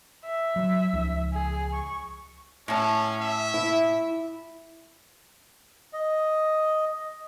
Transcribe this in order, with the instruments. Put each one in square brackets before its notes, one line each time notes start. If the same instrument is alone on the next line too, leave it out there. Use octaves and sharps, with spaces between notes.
[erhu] E5
[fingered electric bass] F#3
C#2 F3
[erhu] G#4
C#6
[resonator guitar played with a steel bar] A2 A5 [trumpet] C#4
[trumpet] E5
[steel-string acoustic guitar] E4
[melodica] D#5